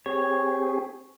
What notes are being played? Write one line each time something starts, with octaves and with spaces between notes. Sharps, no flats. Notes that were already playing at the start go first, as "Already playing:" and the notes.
C4 G4 G#4 C#5